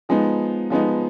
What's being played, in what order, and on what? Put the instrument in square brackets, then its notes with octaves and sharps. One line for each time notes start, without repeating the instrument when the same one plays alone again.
[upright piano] F3 G#3 B3 D#4
F3 G#3 B3 D#4